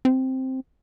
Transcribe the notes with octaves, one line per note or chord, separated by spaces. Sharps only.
C4